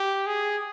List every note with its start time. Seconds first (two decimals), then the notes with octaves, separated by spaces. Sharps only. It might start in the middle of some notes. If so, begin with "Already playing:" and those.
Already playing: G4
0.27 G#4